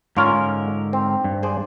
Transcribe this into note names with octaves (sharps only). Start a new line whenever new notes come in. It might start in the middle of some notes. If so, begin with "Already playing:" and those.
G#2 D3 C#4 F4 A#4
C4
G2
G#4 C5 D5